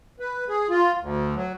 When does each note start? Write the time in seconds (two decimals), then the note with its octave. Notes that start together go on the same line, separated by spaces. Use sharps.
0.20 B4
0.49 G#4
0.69 F4
1.00 D2
1.35 F#3